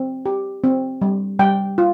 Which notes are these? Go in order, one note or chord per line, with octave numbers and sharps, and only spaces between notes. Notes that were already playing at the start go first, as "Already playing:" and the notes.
Already playing: C4
G4
C4
G3
G3 G5
F4